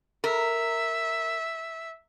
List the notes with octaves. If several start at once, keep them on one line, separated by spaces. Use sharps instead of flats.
A#4 E5